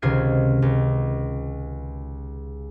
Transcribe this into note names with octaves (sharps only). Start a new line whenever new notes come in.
C#2 C3 D#3 F4 G#6 C7
C#2